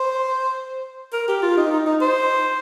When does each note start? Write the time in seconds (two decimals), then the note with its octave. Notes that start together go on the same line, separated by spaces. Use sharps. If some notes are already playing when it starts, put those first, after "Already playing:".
Already playing: C5
1.13 A#4
1.28 G4
1.42 F4
1.57 D#4
1.72 D#4
1.86 D#4
2.01 C5